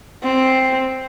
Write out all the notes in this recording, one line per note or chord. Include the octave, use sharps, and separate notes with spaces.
C4